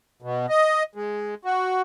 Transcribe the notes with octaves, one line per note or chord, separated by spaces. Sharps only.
B2
D#5
G#3
F#4